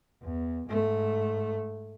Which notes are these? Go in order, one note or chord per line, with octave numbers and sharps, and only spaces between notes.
E2
G#2 A3